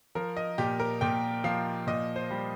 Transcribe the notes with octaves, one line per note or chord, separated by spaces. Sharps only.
F3 A#4
D#5
A#2 G4
A#4
A#2 G5
F3 F5
A#2 D#5
C5
G3